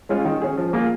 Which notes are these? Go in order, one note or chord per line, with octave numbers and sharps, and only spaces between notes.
G#3 C#4 F4 G#4
D#3
C#4 G#4
F3
A#3 F4 G#4